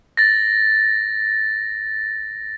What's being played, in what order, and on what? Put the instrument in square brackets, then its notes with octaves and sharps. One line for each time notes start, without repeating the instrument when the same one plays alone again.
[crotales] A6 A#6